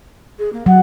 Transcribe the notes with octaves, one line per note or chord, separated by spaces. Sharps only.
G#4
A#3
F#3 F#5